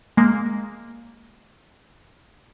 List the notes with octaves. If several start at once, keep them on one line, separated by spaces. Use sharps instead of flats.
G#3 A#3